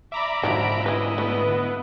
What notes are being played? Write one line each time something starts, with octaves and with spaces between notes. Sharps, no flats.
D5 E5 A#5 B5 D6
G#2 D3 D#3 F3 F#3 D7
C#4 E4 B4 D#5
A3 B3 B4